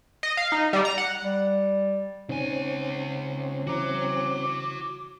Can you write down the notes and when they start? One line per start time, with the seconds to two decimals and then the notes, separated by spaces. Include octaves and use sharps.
0.23 D#5
0.37 F5
0.52 D#4
0.73 G3
0.85 A#5
0.98 F#5
1.25 G3
2.29 C#2 C4 C#4 D#4 G#5
3.67 C#3 E3 E4 F#4 A#5 D6